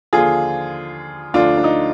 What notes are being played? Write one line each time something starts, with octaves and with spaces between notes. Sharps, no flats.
D#2 D3 F3 F4 G#4
D2 D3 F3 D4 F4
D4
D#4